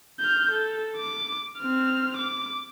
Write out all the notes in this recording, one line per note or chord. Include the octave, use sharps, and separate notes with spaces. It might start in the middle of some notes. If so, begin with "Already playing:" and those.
F6 G6
A4
D6
C4 F6
D6